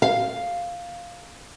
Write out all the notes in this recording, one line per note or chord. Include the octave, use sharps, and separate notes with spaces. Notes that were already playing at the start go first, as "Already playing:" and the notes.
F5